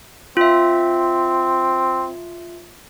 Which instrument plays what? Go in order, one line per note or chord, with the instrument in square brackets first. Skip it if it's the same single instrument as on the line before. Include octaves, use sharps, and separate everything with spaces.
[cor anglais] C4 [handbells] F4 E5